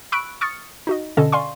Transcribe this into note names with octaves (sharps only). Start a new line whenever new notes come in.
B5 C#6 E6 F#6 D7
C#6 D#6 F6 A6 C#7
D#4 F#4 D#5
B2 D3 C#4 A4 D#5 A5
D5 F5 G#5 C6 C#6